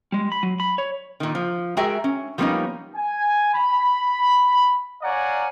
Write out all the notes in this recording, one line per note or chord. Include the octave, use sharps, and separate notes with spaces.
G3 G#3
B5
F#3
B5
C#5
A#2 D#3
F3
G#3 F#4 G#4 A#4 E5 G5
C#4
F3 G3 A#3 B3 C#4 D#4
G#5
B5
C#5 D5 F5 F#5 G#5 A#5